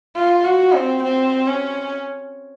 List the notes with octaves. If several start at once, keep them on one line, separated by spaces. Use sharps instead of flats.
F4
F#4
C4
C4
C#4